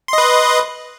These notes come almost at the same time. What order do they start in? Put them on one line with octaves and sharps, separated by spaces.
C6 D#5 B4